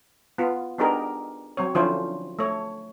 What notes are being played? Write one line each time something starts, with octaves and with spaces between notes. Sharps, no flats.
B3 F4
B3 D4 D#4 G4 G#4 A#4
F#3 C4 C#5
D3 F3 C#4 E4 F4 C5
A3 C#5